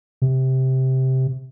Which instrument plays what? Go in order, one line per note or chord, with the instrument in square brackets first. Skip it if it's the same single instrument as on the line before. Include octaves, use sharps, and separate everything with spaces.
[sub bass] C3